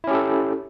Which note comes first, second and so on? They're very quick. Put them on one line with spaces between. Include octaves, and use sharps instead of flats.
E4 C#4 G4 A4